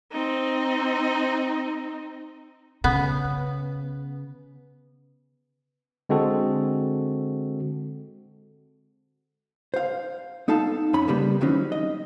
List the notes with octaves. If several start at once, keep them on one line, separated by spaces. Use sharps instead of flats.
C4 D#4
C#3 B3
D3 G#3 C4 F#4 A4
C5 F5
B3 D#4 A4 F5 A5
F2 C#4 B5
C#3 G3 A#3 B3
D#3 E3 F#3 C4 C#4 D#4
D#5